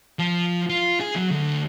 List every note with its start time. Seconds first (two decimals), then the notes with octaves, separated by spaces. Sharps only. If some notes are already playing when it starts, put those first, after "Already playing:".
0.19 F3
0.70 F4
1.00 G#4
1.15 F3 F#3
1.31 D2